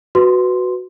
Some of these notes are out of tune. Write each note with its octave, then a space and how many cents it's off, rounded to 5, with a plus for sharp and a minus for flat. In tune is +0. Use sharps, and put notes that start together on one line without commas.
F#4 +0 B4 +5 C6 -5